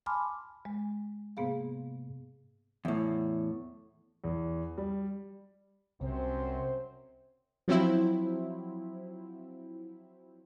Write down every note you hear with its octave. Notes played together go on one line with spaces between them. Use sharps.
G#5 A5 B5 C6 D6 F6
G#3
G#2 C3 A#3 B3 G#4 F5
E2 A2
E2
G3
C2 F#2 C3 C4 C5
F3 F#3 C4 E4